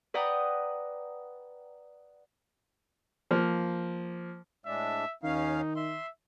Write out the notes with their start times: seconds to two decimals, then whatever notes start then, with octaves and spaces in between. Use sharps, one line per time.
0.14 B4 D5 F#5 G5 A#5 D#6
3.31 F3 A#3
4.66 A2 G#3 D4 E5
5.23 D#2 D#3 C#4 D#4 F5
5.76 E5 C6